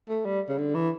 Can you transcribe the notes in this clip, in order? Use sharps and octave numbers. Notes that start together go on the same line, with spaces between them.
A3
G3
C#3
D3
E3